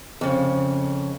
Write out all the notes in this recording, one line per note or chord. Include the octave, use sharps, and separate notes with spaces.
F2 C#3